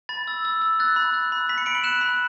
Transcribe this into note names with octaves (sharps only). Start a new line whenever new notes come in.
B5 A6
E6
E6
E6
F#6 A6
B5
F#6
B5
B5 B6
C#7
B5 D7
F#7
F#6 E7
B5